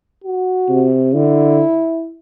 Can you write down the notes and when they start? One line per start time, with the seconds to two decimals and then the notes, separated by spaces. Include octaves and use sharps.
0.24 F#4
0.69 C3
1.15 D3 E4